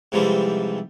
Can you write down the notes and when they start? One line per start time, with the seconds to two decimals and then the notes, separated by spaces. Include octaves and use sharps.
0.12 G#2 C3 E3 F3 G3